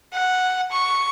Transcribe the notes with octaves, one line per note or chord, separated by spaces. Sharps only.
F#5
C#6